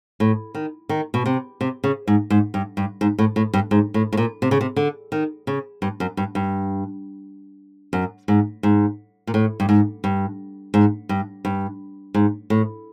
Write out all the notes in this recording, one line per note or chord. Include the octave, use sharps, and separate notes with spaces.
A2
D#3
D#3
B2
C3
C3
C#3
G#2
G#2
G2
G2
G#2
A2
A2
G2
G#2
A2
A2
A#2
C3
C#3
C3
D3
D#3
C#3
G2
F#2
G2
G2
F#2
G#2
G#2
A#2
A2
G2
G#2
G2
G#2
G2
G2
G#2
A2